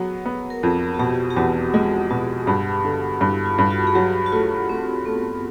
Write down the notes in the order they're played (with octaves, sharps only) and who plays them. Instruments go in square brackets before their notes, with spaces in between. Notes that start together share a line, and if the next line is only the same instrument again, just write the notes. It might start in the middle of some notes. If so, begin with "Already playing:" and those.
Already playing: [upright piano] F#3 B3 [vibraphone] G#4
[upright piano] B3
[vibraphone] A#4
[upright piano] F2
[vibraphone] F#4
[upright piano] B2 [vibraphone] G4
[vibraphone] G4
[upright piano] E2 [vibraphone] F#4
[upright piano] G#3 [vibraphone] F4
[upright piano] B2 [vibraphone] F#4
[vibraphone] G#4
[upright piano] G2 [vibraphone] G4
[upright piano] D3
[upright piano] G2 [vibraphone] E4
[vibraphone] F4
[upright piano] G2
[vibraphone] F#4
G#4
[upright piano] F#3 [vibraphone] G4
[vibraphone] F#4
[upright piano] A3 [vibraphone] F4
[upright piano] A3 [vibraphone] C4
[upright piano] A3 [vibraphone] B3